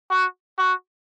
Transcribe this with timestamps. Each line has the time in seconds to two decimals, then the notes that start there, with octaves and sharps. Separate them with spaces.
0.11 F#4
0.58 F#4